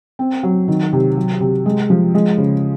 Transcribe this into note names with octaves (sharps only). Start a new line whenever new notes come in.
C4
F#3
D#3
C3
F#3
C3
G#3
F3
G#3
C#3